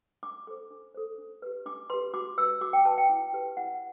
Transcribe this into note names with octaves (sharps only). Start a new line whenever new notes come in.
D4 D6
A4 C5 D6
D4
A4 C5
D4
G4 B4
D4 D6
G4 B4 C6
F#4 D6
B4 E6
F#4 D6
G5
B4 A5
G5
E4
G4 B4
E4 F#5